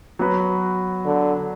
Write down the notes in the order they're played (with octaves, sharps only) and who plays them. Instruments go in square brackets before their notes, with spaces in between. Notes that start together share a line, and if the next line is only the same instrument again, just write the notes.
[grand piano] F#3 B3 F#4 B4
[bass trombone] D3